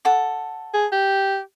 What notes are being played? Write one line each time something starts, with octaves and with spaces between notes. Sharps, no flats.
A4 F#5 D6
G#4
G4